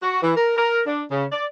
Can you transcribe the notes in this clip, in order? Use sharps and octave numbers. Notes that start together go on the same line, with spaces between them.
F#4
E3
A#4
A#4
D4
C#3
D5